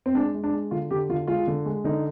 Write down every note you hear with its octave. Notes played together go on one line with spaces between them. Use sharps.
C4
G#3 D4
G#3
D4
G#3
D3 F4
D3 G4
D3 F4
G#3 F4
D3
G#3
D3 D#4